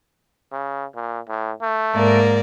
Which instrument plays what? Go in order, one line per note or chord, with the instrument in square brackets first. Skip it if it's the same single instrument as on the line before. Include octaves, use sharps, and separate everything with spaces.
[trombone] C#3
A#2
A2
A3
[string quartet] G#2 A#3 D5